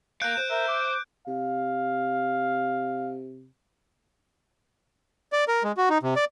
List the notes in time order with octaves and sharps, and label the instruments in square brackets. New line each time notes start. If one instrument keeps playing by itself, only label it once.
[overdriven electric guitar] A#4 F5 [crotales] F#6 G6 D7
[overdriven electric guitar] C5
[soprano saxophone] A#4 [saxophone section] E5
[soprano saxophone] D6
[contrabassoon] C3 [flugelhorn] F5
[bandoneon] D5
A#4
G#3
F#4
D#4
C3
D5